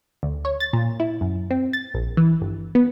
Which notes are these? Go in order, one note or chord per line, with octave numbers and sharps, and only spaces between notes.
D2
C#5
A6
A#2
E4
F#2
C4
A6
A#1
E3
G1
B3